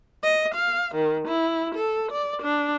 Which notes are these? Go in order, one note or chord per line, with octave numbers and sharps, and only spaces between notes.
D#5
F5
D#3
E4
A4
D5
D4